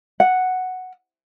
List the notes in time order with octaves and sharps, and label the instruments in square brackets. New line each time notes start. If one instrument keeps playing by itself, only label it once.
[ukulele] F#5